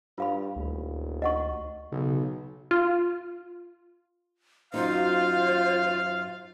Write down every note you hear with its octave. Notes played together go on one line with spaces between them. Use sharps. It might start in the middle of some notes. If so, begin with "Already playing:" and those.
G2 F4 F5 B5
D#1 D2
D#5 F#5 C#6
B1 C#3
F4
F#2 D#4 F4 C5 F5